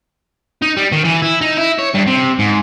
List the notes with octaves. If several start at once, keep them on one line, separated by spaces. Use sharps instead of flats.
D#4
G3
D#3
E3
E4
D#4
E4
C#5
G2
C3
G#2